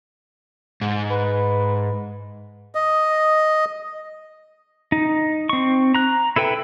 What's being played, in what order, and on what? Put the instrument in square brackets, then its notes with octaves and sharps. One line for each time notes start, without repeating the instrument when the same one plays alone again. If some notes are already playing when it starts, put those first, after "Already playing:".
[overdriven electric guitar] G#2
[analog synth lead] B4
[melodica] D#5
[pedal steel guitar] D#4
C4 C#6
A#5 F#6
E4 A4 B4 G5